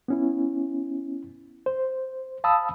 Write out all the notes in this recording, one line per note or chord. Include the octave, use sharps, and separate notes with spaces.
B3 C#4 E4
C5
F5 A5 B5 D#6 E6